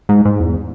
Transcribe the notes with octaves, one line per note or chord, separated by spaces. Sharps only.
G#2
G#2
E2